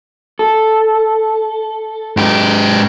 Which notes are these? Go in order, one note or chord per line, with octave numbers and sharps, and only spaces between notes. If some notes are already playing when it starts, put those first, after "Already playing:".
A4
G#2 G4